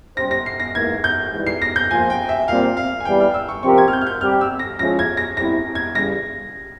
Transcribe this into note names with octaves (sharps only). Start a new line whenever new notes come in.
G3 C#4 G4 C5 A#6
A#6
C7
A#6
G#2 E3 A#3 G#6
G6
G#2 E3 G3
C7
A#6
G6
F3 A#3 F4 C5 G#5
G5
E5
A#2 G3 C4 F5
F5
G#5
E2 E3 G3 G5
F6
E6
C#6
C3 F3 C4 G4 A#4 C#6
G#6
F6
G6
F6
G6
G3 C4 G4 F6
E6
A#6
F3 G#3 C#4 E4 G#4 A#6
G#6
A#6
G3 C4 E4 A#6
G#6
C#3 E3 G3 A#6